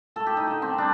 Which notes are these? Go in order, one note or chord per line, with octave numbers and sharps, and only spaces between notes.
A2 A3 A4
G4
D#4
D3 A3
C4
G3 D4